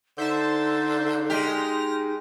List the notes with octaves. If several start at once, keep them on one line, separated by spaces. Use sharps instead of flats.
D3 D#4 C5 E5 A5
G#3 G4 F6 A#6